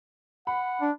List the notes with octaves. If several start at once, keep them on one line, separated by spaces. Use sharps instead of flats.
F#5 B5
D4